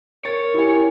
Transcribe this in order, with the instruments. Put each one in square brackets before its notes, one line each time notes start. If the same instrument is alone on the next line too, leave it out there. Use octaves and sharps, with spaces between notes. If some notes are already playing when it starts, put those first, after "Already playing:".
[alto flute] A#4 [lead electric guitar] C#5 [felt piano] A6
[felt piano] E4 G4 G#5